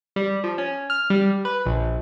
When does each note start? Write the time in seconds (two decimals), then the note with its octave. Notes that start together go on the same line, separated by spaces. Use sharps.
0.16 G3
0.44 F3
0.58 C#4
0.90 F6
1.10 G3
1.45 B4
1.66 A#1